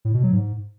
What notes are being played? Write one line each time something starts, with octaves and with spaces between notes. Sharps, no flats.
A2
B2
F#3
G#2